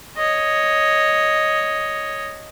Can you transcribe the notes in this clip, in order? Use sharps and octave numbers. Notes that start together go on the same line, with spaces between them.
C#5 D#5